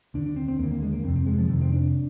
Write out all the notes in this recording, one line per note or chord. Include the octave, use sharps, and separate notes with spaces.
D#2 D3 D4
D4
C4
C4
D#2 D3 A#3
A#3
G#3
A#3
F2 C3 C4
C4
G#3
F3
F2 C3 D#3
C4
D4